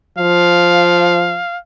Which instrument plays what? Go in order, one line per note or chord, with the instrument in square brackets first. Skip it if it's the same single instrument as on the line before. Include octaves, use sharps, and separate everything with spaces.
[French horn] F3 [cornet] F5